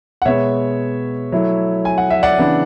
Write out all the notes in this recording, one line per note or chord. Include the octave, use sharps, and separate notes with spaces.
F#5
B2 G#3 B3 C#5 E5
F#3 A3 E4
G#5
F#5
E5
D5 F#5
C#3 E3 B3 D4